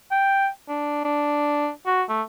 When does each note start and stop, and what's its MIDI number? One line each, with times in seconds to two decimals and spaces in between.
0.11 0.48 79
0.69 1.03 62
1.05 1.69 62
1.86 2.03 66
2.09 2.22 57